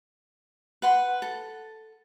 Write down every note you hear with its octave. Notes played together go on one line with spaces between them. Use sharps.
B4 F#5 C6
A4